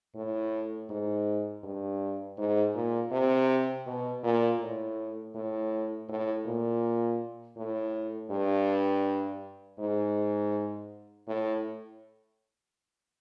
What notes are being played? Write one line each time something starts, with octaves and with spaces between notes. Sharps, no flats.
A2
G#2
G2
G#2
A#2
C3
B2
A#2
A2
A2
A2
A#2
A2
G2
G#2
A2